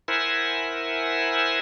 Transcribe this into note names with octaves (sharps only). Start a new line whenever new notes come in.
E4 A#4 C5 E5 F#5 G#5